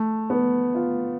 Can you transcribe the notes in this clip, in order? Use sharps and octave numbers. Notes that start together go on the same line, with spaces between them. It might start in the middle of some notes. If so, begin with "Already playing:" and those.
Already playing: A3
B3
F4